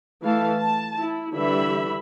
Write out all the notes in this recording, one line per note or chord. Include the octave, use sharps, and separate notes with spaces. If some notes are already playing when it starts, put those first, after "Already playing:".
E3 A3 F5 A5
A5
E4
D3 E3 G3 E5 B5